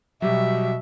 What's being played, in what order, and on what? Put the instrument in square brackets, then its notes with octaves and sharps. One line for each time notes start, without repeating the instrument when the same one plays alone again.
[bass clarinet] B2 [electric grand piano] F#3 G3 G4 [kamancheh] E5